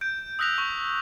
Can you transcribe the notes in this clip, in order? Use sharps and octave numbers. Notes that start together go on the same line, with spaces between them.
G6 D7
D#6 E6 F#6 A#6 B6 F7
C#6